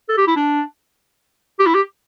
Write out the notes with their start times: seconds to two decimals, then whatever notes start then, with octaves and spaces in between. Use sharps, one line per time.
0.09 A4
0.18 G4
0.27 E4
0.36 D4
1.59 G4
1.66 E4
1.74 G4